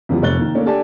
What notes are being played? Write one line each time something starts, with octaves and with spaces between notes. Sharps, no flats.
E2 C#3 E3 F3 G3 B3
F1 C3 C#5 F#6 A6 G7
D#3 A#3
D3 A3 A#3 C#4 D4
D4 G4 A4 D5 G#5 A5